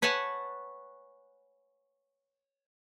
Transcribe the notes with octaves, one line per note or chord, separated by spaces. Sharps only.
B4 C#5 F#5 G#5 A5